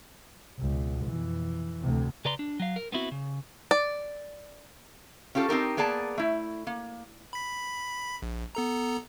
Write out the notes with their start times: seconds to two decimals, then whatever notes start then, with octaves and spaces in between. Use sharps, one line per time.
0.59 C#2 B2
1.06 F2 E3
1.80 D2 C3
2.25 C#3 B4 D5 A#5 C6
2.39 D4
2.60 F#3 F5
2.76 A#4
2.92 B3 C4 E4 F#4
3.11 C#3
3.71 D5
5.35 C#4 F4 G4 A4
5.49 C4 D#4 G4 A#4
5.77 A#3 B3 G#4 D5 A5
6.18 A3 E4
6.67 A#3
7.33 B5 B6
8.22 A#1
8.55 B3 A4 A#5